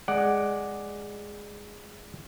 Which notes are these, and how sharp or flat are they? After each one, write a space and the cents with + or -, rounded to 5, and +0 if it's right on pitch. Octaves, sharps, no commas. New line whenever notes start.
G#3 -5 D5 +0 F#5 +10